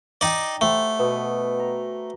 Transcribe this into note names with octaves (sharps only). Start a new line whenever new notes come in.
D#4 D5 G5 A#5
A3 G4 C5 F#5
B2 B3
A#5